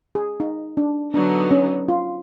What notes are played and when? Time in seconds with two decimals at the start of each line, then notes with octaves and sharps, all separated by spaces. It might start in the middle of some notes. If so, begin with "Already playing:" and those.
0.15 G#4
0.40 D#4
0.77 D4
1.14 D3 F#3 B3 D4 D#4
1.51 C#4
1.88 F4